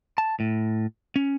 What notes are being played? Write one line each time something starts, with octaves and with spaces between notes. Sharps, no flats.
A5
A2
C#4